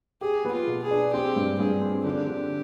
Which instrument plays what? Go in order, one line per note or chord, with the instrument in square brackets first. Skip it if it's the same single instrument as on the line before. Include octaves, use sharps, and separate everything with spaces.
[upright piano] G4 [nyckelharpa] G#4
[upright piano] B3
[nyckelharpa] F4
[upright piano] B2
[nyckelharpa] G#4
[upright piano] D4
[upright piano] C4 [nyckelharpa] G4
[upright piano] G2
[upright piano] G2 [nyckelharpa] G#4
[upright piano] C4
[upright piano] D3 [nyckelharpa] G4
[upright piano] D3